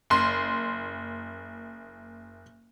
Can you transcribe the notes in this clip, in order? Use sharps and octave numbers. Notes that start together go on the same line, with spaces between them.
F#1 C6